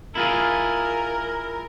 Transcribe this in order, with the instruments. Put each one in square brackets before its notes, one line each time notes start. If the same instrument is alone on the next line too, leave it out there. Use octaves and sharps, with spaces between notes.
[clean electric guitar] E4 F4 G#4 [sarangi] A#4